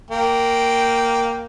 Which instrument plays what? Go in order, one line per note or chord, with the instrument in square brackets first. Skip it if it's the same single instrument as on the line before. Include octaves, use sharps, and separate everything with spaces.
[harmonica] A#3 G5